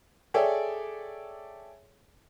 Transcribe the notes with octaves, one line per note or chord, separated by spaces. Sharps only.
G#4 A4 C#5 D5 E5 G5